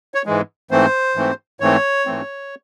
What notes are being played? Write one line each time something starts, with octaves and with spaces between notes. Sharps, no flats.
C#5
G#2 E3 G#3
G#2 E3 A3 C4 C5
G#2 E3 A3 C4
G#2 E3 A3 C4 C#5
G#2 E3 A3 C4